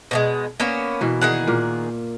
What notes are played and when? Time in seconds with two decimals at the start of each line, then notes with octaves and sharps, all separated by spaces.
0.11 B2 E3 G#3
0.60 A#3 B3 C#4
1.01 B2 E3 A#3
1.21 D#3 G#4 F#5
1.47 A#2 A#3